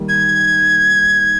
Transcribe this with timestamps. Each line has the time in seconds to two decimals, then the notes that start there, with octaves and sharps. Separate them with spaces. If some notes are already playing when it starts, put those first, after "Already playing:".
Already playing: D#3 G3 A#3
0.09 G#6